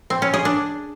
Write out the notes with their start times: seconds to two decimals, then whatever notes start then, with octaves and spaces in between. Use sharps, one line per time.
0.10 C4
0.22 C#4
0.34 G#4
0.45 D4